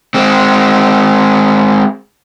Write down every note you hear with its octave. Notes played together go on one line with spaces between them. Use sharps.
G#3 C4